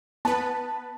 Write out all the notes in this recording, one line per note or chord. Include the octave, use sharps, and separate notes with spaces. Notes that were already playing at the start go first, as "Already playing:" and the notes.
B3 B4 A5